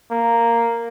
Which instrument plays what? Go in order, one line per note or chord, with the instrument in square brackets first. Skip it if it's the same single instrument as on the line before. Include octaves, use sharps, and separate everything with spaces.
[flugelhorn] A#3